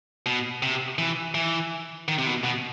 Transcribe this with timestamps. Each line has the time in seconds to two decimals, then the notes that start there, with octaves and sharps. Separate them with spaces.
0.26 B2
0.63 C3
0.98 E3
1.35 E3
2.08 D#3
2.18 C3
2.27 B2
2.44 B2